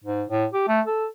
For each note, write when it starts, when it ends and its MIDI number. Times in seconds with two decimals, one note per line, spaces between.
0.04 0.24 44
0.29 0.46 45
0.53 0.65 67
0.68 0.81 57
0.87 1.07 69